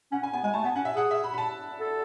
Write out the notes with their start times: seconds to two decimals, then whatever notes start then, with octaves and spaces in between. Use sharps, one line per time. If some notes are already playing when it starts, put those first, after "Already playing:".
0.12 C#4 F#5
0.22 C#4 G#5
0.33 B3 G#5
0.43 G#3 G#5
0.54 A3 A5
0.64 B3 A5
0.76 C#4 F#5
0.85 E5
0.96 G#4 F#5
1.11 E5
1.24 B5
1.34 B5
1.38 A5
1.80 A4